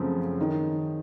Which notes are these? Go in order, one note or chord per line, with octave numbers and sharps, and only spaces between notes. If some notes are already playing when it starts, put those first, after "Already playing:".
Already playing: F#2 C#3 F3 A3 C4
D#3